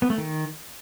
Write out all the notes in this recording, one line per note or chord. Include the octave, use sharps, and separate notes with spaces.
B3
A3
D#3